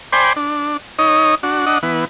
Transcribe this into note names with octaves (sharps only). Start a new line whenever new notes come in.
C5 D5 G5 G#5 B5 C6
D4
D#4 C#5 D#5
D4 F#4
D4 D#5 F#5
E3 B3